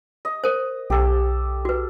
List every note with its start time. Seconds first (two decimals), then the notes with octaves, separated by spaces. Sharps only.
0.25 D#5
0.44 A#4 C5
0.90 B1 G4 A4
1.65 F#4 B4